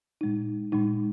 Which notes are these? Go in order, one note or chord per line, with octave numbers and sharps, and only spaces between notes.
A#2 G#3 D#4
A#2 G#3 D#4